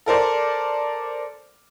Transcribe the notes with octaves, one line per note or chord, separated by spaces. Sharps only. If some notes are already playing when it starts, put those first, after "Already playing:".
A4 A#4 C5 D5